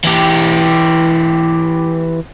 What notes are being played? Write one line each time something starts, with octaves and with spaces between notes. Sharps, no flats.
E3 G4